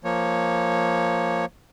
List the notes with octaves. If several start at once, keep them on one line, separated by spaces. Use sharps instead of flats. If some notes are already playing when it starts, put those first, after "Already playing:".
F3 A#3 C#5